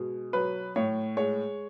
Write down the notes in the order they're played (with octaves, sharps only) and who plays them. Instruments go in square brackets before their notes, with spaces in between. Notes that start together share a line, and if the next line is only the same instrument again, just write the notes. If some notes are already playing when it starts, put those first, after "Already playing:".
Already playing: [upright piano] B2 G#3
F#3 B4
A2 C#5
G#3 C#5